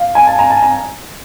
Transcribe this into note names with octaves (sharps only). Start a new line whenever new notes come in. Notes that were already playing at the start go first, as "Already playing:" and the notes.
Already playing: F5
G#5
A5
A#5
A5
A#5